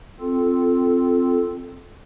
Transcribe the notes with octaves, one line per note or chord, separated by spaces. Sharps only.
C4 F4 A4